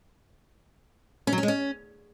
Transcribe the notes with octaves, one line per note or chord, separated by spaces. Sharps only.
C#4
F#3
C#4
G#3
C#4